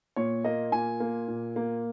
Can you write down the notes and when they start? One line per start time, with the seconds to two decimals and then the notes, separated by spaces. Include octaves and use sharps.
0.16 A#2 C#5
0.44 A#3 D#5
0.72 A#2 G#5
1.00 A#3
1.28 A#2
1.56 A#3